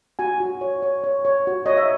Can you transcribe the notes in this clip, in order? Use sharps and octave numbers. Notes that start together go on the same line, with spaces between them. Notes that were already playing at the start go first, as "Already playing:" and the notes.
F#4 G#5
F#4
C#5
C#5
C#5
C#5
F#4
C#5 D#5
E5